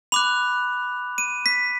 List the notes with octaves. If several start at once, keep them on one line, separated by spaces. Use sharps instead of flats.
B5 D6 F#6 F7
D#7
B6